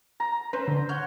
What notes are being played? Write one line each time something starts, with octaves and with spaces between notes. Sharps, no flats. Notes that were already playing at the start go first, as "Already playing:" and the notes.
A#5
C#4 B4 C5
D3
C#5 F#5 F6 G6